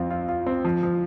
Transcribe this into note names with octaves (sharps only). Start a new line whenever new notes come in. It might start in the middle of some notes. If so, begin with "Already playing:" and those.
Already playing: F2 C4 F4
F4
F4
C4
F3
F3